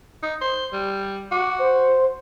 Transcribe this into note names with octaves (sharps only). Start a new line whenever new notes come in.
D#4
C5
G3
F#4 D6
C5